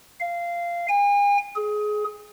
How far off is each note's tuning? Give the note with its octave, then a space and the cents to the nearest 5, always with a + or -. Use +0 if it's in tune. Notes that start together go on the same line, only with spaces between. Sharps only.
F5 -15
G#5 -40
G#4 +20